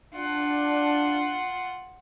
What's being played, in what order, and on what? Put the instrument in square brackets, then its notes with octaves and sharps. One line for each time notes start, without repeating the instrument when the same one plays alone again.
[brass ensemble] D4 [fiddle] F4 F#5